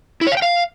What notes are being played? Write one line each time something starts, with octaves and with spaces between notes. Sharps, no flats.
E4
C#5
F5
G5
F5